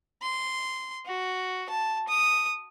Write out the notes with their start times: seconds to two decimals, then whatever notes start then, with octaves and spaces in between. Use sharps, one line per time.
0.22 C6
1.06 F#4
1.70 A5
2.08 D#6